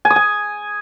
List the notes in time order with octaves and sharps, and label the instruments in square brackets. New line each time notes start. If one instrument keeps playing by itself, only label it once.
[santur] G#5
D#6
G#5